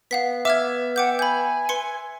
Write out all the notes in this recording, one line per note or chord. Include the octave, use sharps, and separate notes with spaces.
B3 F5 F#5 B6
E5 D6 F6 G#6
F#5 G5 D6 G6
G#5 B5 G6
B4 C6 C#7